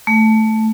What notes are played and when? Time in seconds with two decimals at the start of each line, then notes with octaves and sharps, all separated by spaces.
0.07 A3